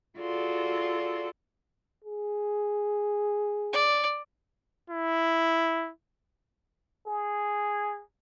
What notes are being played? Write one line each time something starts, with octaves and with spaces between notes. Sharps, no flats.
F4 F#4 G#4 A4 D5 C6
G#4
D5
E4
G#4